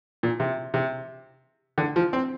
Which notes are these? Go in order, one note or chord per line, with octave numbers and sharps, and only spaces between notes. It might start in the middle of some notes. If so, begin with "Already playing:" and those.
A#2
C3
C3
D3
F3
C4